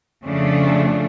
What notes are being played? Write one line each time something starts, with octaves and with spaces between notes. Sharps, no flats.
F2 C#3 F3 A3 D4